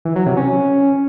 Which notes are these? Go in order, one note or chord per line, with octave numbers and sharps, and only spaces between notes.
E3
F#3
C3
C#4